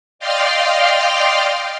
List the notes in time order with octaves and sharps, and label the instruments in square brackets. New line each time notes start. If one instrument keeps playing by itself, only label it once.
[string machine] D5 D#5 F5 G5 C6 F6